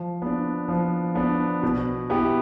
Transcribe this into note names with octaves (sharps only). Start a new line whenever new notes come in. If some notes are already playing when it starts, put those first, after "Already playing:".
Already playing: F3
B3 D4
F3
B3 D4
B2
B3 E4 G4